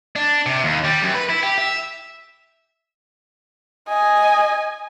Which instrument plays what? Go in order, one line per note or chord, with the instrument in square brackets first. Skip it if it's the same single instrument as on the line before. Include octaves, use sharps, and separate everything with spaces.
[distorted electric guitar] D4
C3
D#2
G3
F#2
B4
E4
G4
E5
[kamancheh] D#5 [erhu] G#5